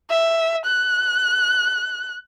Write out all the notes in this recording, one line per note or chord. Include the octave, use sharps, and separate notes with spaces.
E5
F#6